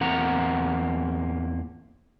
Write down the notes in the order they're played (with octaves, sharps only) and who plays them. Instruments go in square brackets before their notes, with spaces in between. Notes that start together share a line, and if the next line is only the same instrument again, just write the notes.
[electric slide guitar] E2 A#3 C4 F#5 A#5